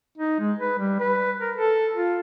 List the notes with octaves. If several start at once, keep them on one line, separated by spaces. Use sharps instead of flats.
D#4
G#3
B4
G3
B4
A#4
A4
F4